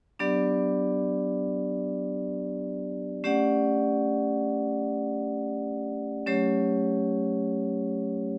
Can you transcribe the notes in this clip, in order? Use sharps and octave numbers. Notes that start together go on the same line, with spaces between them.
F#3 B3 D4 G4 D5
A3 C#4 G4 D5 F#5
F#3 A3 C#4 G4 C#5